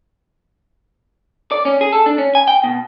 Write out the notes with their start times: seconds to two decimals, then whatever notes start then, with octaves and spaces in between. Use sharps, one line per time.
1.51 D5
1.65 C#4
1.81 G#4
1.92 A4
2.06 D4
2.18 C#4
2.35 G#5
2.48 G5
2.64 B2